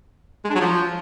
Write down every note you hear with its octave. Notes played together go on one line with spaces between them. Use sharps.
G#3
D4
F#3
F3